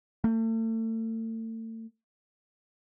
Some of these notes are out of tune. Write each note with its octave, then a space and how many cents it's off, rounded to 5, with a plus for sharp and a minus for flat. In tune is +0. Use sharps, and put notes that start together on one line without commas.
A3 +40